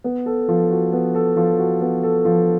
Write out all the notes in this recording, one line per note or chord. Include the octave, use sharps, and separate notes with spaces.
B3
A4
F3
F#4
B3
A4
F3
F#4
B3
A4
F3